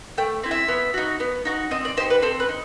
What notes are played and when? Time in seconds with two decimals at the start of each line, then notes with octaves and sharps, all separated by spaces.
0.18 A3 G5
0.43 C4 E4
0.51 E5
0.68 B3
0.94 D#4 F#4
1.20 B3
1.45 D#4 F#4
1.71 C4 D#5
1.85 D5
1.97 D#4 C5
2.00 G4
2.10 B4
2.22 C4 A4
2.40 B4
2.49 D#4